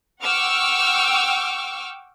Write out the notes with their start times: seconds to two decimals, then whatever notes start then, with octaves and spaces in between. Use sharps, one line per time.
0.22 F#5 G5 C#6 D6 E6 F6